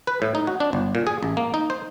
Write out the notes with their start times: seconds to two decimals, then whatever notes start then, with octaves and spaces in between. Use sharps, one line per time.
0.07 B4
0.22 A2
0.35 D#4
0.47 F#4
0.60 D4
0.73 G1
0.95 A#2
1.07 G#4
1.23 A1
1.37 A#3
1.54 D#4
1.70 C5